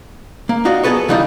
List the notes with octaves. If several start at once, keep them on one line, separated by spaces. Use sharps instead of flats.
A#3
D#4 F4 F#4 D5
F#3 B3 G#4 A4 B4 C#5
D3 E3 G3 A#3 D#4 F4